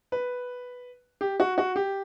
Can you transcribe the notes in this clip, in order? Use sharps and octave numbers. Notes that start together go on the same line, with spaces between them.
B4
G4
F#4
F#4
G4